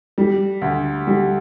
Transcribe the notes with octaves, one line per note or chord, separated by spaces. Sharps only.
G3
D2
G3